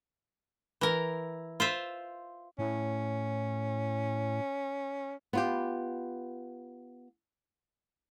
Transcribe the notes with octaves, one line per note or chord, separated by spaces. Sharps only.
E3 A#4
F4 C5 E5
A2 C#4
B3 F4 G4